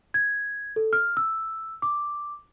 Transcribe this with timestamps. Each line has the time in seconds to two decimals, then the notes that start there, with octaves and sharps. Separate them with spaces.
0.14 G#6
0.76 A4
0.93 F6
1.17 E6
1.82 D6